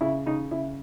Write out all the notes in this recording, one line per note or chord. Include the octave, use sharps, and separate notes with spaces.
C#3 E4
C#3 D#4
C#3 E4